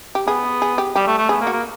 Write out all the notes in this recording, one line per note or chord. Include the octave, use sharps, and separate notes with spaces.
G4
B3 G#4
G#4
G4
G3 G4
A3
A3
B3 G#4
A#3
F#4
A#3